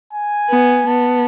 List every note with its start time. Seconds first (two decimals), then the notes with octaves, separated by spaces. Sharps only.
0.13 G#5
0.50 B3
0.87 B3 A5